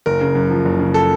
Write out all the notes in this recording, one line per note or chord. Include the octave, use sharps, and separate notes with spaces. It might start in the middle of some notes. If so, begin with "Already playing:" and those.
F#1 A#4
C#3
F#2
F3
F#1
C#3
A4